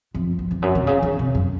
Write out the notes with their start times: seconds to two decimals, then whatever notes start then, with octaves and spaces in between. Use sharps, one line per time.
0.15 F2
0.39 E2
0.51 F2
0.62 F#2
0.75 C3
0.87 C#3
1.03 D3
1.19 C3
1.35 F#2